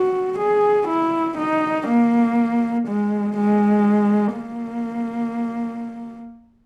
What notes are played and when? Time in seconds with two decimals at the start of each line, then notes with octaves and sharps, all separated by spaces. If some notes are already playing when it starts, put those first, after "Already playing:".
Already playing: F#4
0.39 G#4
0.88 E4
1.38 D#4
1.88 A#3
2.88 G#3
3.37 G#3
4.37 A#3